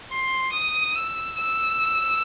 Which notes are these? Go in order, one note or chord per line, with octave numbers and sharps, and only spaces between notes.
C6
D#6
E6
E6